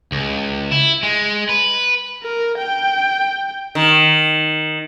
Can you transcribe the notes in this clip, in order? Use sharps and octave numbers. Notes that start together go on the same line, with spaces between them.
C#2
E4
G#3
B4
A#4
G5
D#3